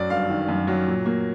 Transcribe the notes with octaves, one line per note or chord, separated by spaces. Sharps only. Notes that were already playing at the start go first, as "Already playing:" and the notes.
Already playing: F#2 F#3 D5
G1 F5
D#3
F#2
F#3
A#2
A#3